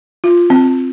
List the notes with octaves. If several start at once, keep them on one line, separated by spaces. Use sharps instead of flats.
F4
C4